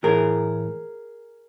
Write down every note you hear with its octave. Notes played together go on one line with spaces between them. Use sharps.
A2 E3 G#4 A#4